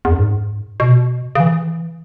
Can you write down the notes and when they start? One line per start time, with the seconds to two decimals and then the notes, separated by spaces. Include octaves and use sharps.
0.05 E2
0.12 F#2
0.19 G#2
0.80 B2
1.35 C#3
1.40 E3